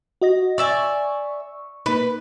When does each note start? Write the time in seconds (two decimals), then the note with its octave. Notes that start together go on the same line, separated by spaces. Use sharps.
0.22 F#4 D#5 A#6
0.58 D5 E5 G#5 C#6
1.86 A#3 D#4 B4